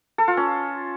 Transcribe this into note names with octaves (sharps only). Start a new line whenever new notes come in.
A4
F4
C#4